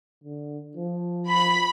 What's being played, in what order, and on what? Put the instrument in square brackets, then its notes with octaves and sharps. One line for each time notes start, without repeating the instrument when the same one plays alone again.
[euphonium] D3
F3
[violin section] B5